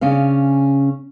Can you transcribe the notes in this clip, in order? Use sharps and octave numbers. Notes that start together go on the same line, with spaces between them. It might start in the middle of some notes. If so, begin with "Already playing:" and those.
C#3 C#4 D4 F5